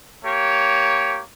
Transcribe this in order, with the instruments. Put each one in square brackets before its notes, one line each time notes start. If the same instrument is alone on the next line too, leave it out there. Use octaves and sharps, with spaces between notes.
[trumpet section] A#3 G4 C#5